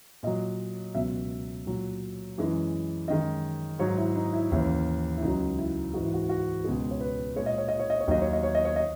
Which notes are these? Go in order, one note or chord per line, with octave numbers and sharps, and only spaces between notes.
A#2 F#3 D#5
C#2 B2 F#3 E5
A#2 F#3
F#2 E3 G#3
F#2 D#3 G#3 D#5
G#2 F#3 C#5
E4
D#4
E4
D#2 C#3 E3 E4
E4
C#2 C#3 F#3 D#4
E4
G#2 E3 G#3 F#4
E4
F#4
F#4
C#2 B2 G#3 G#4
C#5
B4
A#2 G#3 C#5
D#5
C#5
D#5
C#5
D#5
C#5
D#2 D#3 F#3 D#5
C#5
D#5
C#5
D#5
C#5
D#5